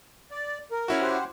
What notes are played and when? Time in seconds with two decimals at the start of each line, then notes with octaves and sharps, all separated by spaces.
0.31 D5
0.71 A#4
0.88 C#4 E4 F#4
1.01 G4 C5 F#5